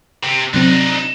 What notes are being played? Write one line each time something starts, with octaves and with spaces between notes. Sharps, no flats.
C3
C3 F#3 C4 D4 D#4